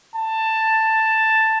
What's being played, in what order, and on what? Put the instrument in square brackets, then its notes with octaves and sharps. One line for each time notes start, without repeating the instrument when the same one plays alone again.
[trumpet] A5